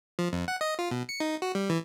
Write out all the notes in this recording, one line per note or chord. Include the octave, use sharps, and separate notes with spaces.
F3
F2
F#5
D#5
F4
B2
C#7
D#4
F#4
G3
E3